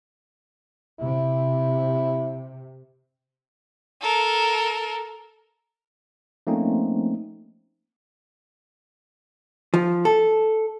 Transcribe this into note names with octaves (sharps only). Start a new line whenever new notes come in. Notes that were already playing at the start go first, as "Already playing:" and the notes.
C3 E4
A4 A#4
F3 A3 A#3 C4 C#4 D#4
F3
A4